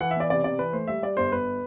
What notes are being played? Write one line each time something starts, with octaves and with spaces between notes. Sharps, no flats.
E3 F#5
E5
B3 D5
C3 D5
C3 D5
E3 B4
A3 C5
G3 E5
G3 D5
G1 C5
G1 B4